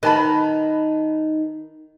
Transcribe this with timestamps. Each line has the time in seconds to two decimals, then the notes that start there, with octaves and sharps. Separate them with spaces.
0.03 D#3 B4 A5 B5